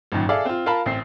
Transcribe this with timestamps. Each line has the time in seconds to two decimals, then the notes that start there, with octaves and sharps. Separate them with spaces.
0.12 G#1 F#2 A#2 D#3
0.29 G#4 A4 D5 E5 F5
0.45 C4 F4
0.66 F4 A#4 F5 A5 B5
0.86 A1 C4 C7